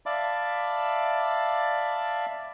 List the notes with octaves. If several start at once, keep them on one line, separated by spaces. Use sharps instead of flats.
D5 E5 F5 A5 B5 D6